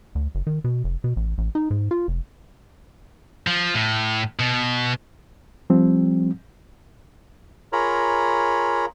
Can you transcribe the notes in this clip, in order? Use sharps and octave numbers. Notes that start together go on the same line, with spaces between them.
D2
F#1
D#3
B2
F1
B2
A1
A1
D#4
G#2
F4
F1
F3
A2
B2
F3 G3 C4
F4 G#4 A#4 C#5 A#5 B5